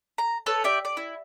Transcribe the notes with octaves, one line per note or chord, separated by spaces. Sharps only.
A#5
A4 B4 C#5 A5
G4 D5 E5
D5
E4